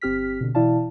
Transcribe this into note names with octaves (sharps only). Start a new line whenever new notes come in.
G1 C4 G4 F6 B6
B2 D3
B2 E3 E4 D5 F5 A5